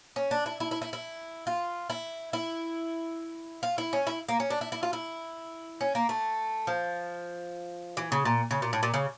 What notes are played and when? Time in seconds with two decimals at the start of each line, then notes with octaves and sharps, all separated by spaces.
0.16 C#4
0.31 D4
0.46 E4
0.60 E4
0.71 E4
0.82 E4
0.93 E4
1.47 F4
1.90 E4
2.33 E4
3.63 F4
3.78 E4
3.93 C#4
4.07 E4
4.29 A#3
4.40 C#4
4.50 D4
4.61 E4
4.72 E4
4.83 F4
4.93 E4
5.81 C#4
5.95 A#3
6.09 A3
6.67 F3
7.97 E3
8.12 C#3
8.25 A#2
8.51 C#3
8.62 A#2
8.73 A2
8.83 A#2
8.94 C#3